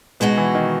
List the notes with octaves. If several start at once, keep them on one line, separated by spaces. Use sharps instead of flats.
B2 G#3 B3 D#4 F#4
E3
D#3